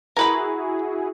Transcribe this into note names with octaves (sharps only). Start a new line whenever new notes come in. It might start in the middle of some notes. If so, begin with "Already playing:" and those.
E4 F#4 G#4 A#4 B4 B5